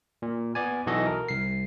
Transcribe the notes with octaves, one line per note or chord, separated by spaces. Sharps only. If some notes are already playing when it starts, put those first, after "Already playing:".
A#2
B3 D5 G#5
B1 E3 F#4 A4 D#5
A#4
C2 C7